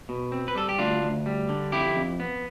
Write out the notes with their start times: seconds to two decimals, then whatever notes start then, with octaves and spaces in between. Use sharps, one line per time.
0.09 B2
0.32 C4
0.48 B4
0.55 G3 A4
0.69 G4
0.79 D2 D4 F4
1.03 D2
1.26 G3
1.49 D3
1.72 F2 E4 G4
1.96 F2
2.20 B3